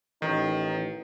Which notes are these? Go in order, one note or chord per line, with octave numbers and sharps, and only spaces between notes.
A1 D#3 D#4